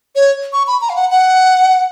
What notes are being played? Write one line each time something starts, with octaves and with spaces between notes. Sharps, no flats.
C#5
C#6
B5
A#5
F5
F#5
F#5